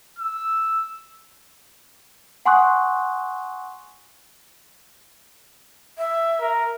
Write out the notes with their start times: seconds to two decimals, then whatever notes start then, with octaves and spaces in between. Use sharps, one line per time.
0.19 E6
2.46 F#5 G#5 C6 C#6 D#6 F#6
5.98 E5
6.40 A#4